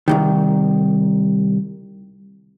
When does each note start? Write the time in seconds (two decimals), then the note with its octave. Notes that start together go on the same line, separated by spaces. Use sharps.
0.08 C2 F2 D#3